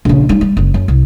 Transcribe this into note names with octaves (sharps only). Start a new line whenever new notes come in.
A#1 C#3
G3 D#4
G3
F#1
F#2
C2